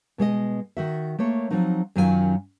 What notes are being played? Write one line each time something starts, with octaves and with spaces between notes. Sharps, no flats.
B2 G#3 C#5 D#5
D#3 F#4 E5
A3 A#3 C#5
F3 F#3 C4 D#4 F#4
F#2 D#3 F#3 C#4 F4 G#5